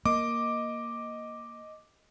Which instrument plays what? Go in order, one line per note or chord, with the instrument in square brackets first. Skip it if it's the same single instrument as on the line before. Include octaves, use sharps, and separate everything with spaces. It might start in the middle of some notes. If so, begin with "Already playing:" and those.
[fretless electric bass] A#3 [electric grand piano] D#5 D6